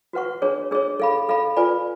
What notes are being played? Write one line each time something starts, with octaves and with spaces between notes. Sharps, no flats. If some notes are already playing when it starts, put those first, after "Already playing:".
F#4 B4 F#5 C#6
D4 G#4 C#5
D4 G#4 C#5
A4 F5 B5
A4 F5 B5
F4 B4 D5 G#5 B5